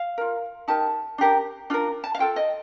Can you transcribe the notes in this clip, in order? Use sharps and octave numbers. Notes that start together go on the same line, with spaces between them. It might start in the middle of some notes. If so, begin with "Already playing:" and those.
Already playing: F5
F4 A#4
D#4 G4 A#4 A5
D4 G4 A#4
D4 F4 A#4
A5
F5
F4 A4 G5
D#5